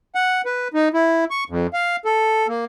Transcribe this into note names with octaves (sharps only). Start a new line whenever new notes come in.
F#5
B4
D#4
E4
C#6
F2
F5
A4
A#3